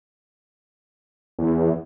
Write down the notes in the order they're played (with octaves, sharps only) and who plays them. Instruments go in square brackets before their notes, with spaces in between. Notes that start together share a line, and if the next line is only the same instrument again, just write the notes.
[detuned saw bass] E2